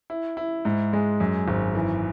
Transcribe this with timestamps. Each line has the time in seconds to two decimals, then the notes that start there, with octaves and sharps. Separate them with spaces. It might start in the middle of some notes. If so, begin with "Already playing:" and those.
0.10 E4
0.37 E4
0.65 G#2
0.93 G#3
1.20 F#2
1.48 G#1
1.75 E3